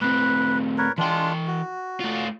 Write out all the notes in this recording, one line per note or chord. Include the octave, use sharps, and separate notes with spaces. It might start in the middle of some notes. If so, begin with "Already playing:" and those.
A2 C4 B4
A#4 B4 C#5
E3 G#3 D4 F4 G5
F#4
A3 F4